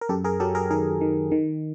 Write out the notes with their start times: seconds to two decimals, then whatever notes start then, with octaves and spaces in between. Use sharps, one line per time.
0.01 A#4
0.09 F#2 G4 A4
0.24 G#4 A#4
0.40 F#3 G4 A4
0.55 G#4 A#4
0.71 D#3 G#4 A#4
1.01 D#3
1.32 D#3